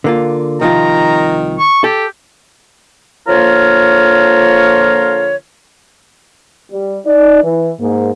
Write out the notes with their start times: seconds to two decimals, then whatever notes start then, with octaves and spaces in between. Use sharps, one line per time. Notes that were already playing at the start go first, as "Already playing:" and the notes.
0.04 D3 A#3 F4
0.61 C2 D#3 F3 F4 A#5
1.59 C#6
1.84 G4 A4
3.27 D3 F3 A#3 F4 A#4 C#5
6.71 G3
7.06 D#4 D5
7.43 E3
7.81 G#2 A#3